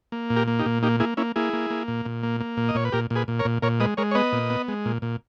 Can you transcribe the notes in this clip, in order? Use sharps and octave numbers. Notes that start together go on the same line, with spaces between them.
A#3
A#2
G4 A#4
A#3
D#4 G4
A#2
A#3 D#4 G4
A#3 E4 G#4
A#3 C#4 E4
A#3 E4 G#4
A#3
A#3
A#2
A#2
A#3
A#3
A#2
D#5
A#2 C#5
B4
A#2 G4 A#4
A#2
G#4 B4
A#2
A#4 C#5
A#2
A#2 A#4 C#5
G#3 B4 D#5
G#3 A#4 C#5
C#5
B3 B4 D#5
A#2
B3
G#3
A#2
A#2